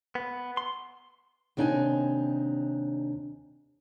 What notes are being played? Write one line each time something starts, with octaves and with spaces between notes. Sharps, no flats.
B3
C6
D#2 C3 D4 D#4 G#5